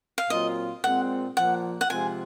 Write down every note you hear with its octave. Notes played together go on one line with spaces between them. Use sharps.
F5
A#2 F#3 C4 F4 D#5
A#2 G#3 C4 F#5
A#2 F3 A#3 F#5
F#5
C3 F3 G#3 C4 F4 G#5